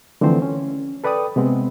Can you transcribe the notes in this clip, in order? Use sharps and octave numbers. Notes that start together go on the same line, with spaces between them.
D3 E3 F3 A3 C4 C5
C#4
A4 B4 D5 G5 D#6
C3 G#3 B3 C4